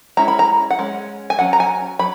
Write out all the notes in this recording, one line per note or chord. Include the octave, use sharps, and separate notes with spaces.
G#3 C#4 E4 A#5
B5
A#5
F#5
G#3 C#4
G#5
F#3 C#4 F#5
A#5
G#5
F#3 B5